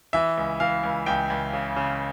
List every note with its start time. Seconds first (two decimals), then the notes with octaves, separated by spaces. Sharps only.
0.13 E3 E5
0.37 C#2
0.60 E3 F5
0.83 C#2
1.06 C#2 G5
1.30 C#2
1.53 C#3
1.76 C#3